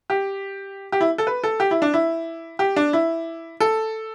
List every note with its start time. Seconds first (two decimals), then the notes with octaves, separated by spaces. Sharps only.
0.10 G4
0.92 G4
1.01 E4
1.18 A4
1.27 B4
1.44 A4
1.60 G4
1.71 E4
1.82 D4
1.94 E4
2.59 G4
2.76 D4
2.93 E4
3.60 A4